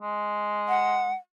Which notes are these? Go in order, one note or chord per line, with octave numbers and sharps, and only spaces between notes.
G#3
F#5